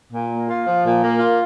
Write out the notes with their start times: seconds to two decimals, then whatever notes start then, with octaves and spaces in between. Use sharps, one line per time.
0.12 A#2
0.30 A#3
0.48 F4
0.65 F3
0.84 A#2
1.02 A#3
1.19 F4